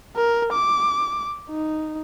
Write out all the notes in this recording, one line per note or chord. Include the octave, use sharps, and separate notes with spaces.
A#4
D6
D#4